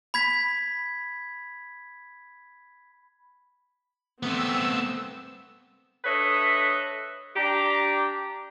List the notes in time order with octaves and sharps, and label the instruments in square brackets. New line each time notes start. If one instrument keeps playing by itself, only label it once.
[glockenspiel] B5 G#6 B6
[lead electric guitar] A3 B3 [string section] C4 E6
[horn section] D4 A4 B4 C#5 D#5 E5
D4 G4 A#5